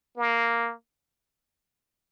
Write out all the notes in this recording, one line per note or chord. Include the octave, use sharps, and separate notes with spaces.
A#3